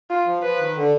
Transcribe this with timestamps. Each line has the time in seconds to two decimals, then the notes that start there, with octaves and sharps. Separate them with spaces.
0.10 F4
0.26 F3
0.42 F3 B4
0.59 D#3
0.76 D3